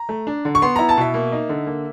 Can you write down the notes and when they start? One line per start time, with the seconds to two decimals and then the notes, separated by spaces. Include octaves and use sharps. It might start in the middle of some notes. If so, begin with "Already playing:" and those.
Already playing: A#5
0.09 A3
0.27 D4
0.45 D3
0.55 C#6
0.62 B3 C6
0.76 E4 A#5
0.89 A5
0.98 B2 E5
1.14 A#3
1.32 D#4
1.49 D3
1.67 A#3